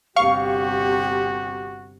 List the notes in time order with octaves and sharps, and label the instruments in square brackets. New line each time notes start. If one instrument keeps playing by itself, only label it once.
[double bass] G1 C3 [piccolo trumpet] F#4 [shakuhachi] G4 [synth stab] F5 C#6